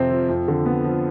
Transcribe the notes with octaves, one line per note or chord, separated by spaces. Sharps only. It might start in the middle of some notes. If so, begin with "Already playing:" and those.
Already playing: F2 C3 C4
F3
F2
D3
B3
F3